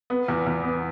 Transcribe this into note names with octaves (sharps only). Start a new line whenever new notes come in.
B3
E2
E2
B3